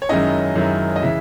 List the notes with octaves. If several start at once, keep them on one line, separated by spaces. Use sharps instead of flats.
C#5
F#2 D#3 G#3 C#4 E4 D#5
F#2 D#3 G#3 C#4 E4
D#5
C#3 E3 E5